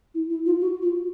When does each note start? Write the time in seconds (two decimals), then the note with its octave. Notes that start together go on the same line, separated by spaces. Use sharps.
0.14 E4
0.30 E4
0.46 F4
0.61 F#4
0.82 F4